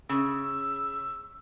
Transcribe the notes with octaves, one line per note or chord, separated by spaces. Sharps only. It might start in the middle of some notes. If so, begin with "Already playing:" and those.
C#3 E6